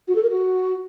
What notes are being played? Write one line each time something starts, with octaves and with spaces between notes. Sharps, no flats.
F#4
A4
A#4
F#4